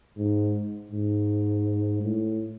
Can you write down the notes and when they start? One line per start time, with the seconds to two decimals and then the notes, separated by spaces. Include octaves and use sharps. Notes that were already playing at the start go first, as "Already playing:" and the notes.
0.18 G#2
0.92 G#2
2.03 A2